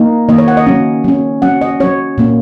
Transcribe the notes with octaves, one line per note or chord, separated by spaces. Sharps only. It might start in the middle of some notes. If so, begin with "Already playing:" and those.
Already playing: A#3 D#4
D#3 A#3 D#4 D#5
C#5
F#5
D#5
F#3 C#4
F#3 C#4
F#3 C#4 F#5
D#5
F#3 C#4 C#5
A#2 A#3 C#4